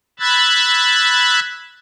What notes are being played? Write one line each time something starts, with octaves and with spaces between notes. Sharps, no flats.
B5 E6 F#6 G#6 A6